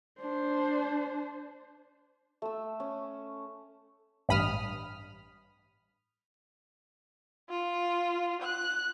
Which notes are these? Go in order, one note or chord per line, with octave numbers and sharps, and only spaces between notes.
D4 C5
A3 E6
C#4
A1 G2 B5 D#6 F6
F4
F#6